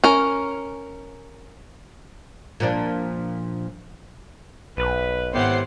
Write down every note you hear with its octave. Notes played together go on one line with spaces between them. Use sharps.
C#4 A#4
A#2 F3 D4
B1 B4
G#1 A2 B3 G4 C5 F#5 C7